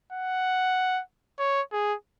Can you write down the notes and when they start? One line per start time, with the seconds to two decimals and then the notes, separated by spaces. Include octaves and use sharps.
0.12 F#5
1.39 C#5
1.72 G#4